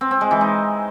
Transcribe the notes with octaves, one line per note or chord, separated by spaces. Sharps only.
C4
C4
G#3
E3
D#4